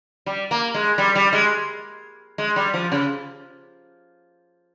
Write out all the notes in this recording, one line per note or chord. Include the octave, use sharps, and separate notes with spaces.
G3
A#3
G#3
G3
G3
G#3
G#3
G3
F3
C#3